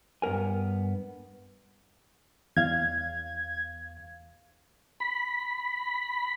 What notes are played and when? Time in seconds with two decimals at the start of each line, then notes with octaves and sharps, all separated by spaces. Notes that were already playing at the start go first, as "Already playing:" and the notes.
0.22 G2 B3 A#4 G#5
2.57 E2 F5 G#6
5.00 B5